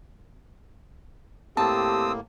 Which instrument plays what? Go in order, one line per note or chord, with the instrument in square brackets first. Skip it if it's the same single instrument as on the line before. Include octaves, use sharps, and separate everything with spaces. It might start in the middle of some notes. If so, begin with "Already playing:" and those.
[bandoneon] A2 A#3 [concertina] C4 D#6 E6 [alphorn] G4 [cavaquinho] A5